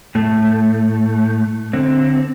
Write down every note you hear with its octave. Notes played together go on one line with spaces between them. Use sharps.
A2 A3
D3 C4